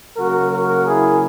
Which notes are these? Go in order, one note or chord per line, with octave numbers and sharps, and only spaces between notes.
C#3 F#3 A#3 F#4 A#4
F#4 A#4
E4 G#4